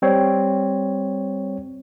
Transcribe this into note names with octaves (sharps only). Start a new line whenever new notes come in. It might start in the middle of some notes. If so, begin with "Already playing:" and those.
G3 C4 C#5